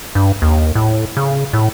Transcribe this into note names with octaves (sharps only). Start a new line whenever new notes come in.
G2
D#2
A2
C#3
A2